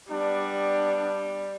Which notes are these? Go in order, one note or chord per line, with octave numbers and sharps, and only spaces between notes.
G3 B3 D4